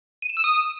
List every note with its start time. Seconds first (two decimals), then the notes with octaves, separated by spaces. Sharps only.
0.22 D#7
0.30 E7
0.37 E6
0.44 D#6